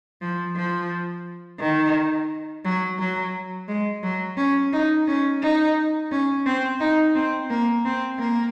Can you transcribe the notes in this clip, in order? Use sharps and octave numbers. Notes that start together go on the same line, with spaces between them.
F3
F3
D#3
F#3
F#3
G#3
F#3
C#4
D#4
C#4
D#4
C#4
C4
D#4
C4
A#3
C4
A#3